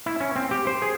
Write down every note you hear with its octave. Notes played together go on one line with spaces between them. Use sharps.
E4
C#4
C4
G4
C5
G#4